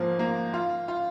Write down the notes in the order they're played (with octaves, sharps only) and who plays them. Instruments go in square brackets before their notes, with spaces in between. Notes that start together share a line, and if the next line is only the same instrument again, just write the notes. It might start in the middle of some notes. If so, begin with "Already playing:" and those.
Already playing: [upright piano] G#2 F3 A#3
A#3
F4
F4